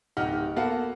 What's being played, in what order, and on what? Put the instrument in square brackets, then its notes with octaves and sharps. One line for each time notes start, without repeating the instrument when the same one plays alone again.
[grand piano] D1 D#4 G4 F#5 F6
A#3 B3 F#4 A4 F5 F#5